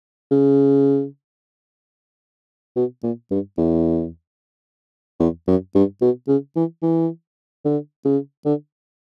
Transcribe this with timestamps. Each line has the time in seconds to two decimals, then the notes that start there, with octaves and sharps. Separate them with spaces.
0.31 C#3
2.76 B2
3.03 A#2
3.31 G2
3.57 E2
5.19 E2
5.47 F#2
5.75 G2
6.01 B2
6.28 C#3
6.56 E3
6.82 E3
7.65 D3
8.05 C#3
8.45 D3